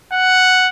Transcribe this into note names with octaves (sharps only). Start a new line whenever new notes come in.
F#5